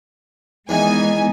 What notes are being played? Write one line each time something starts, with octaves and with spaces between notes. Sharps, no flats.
E2 D#3 E3 G#3 B3 D#4 G#5